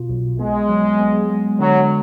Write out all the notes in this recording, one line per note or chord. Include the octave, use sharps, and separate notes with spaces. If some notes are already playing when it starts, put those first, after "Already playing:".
Already playing: B2 F4
B1
G#3 B3
F#3
B3
G#3
D3 F#3